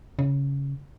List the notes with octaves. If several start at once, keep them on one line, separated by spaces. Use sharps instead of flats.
C#3